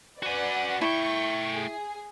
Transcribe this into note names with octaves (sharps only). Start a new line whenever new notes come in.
F#4 B4 D5 F#5 G#5
A3 E4 G5 C#6
G#4